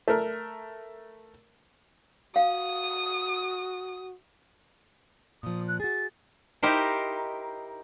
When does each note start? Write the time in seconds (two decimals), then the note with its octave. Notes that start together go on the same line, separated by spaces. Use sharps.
0.08 A3 A#4
2.36 F#4 F5 D#6
5.43 A#2 F3 D#6
5.68 F#6
5.80 F#4 G#4 A6
6.63 D#4 E4 G4 A#4 C5